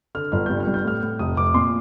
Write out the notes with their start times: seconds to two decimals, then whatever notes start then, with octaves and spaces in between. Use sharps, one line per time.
0.15 D3 F6
0.32 G1 F6
0.46 G2 G6
0.60 F6
0.67 G2
0.74 G6
0.85 A2 F6
1.03 A2
1.19 F1 D#6
1.37 F1 D6
1.54 A#2 C6